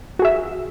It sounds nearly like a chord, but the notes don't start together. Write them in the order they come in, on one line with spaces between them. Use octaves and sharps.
F#4 G#4 E5